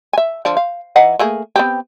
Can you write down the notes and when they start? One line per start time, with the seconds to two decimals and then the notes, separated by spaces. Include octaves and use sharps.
0.13 E5 G#5
0.45 D3 F3 D4
0.57 F5
0.96 E3 D#4 F#5
1.19 A3 A#3 G#4
1.56 B3 C4 G4